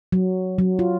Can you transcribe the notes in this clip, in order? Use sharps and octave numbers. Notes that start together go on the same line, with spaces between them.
F#3
F#3
F4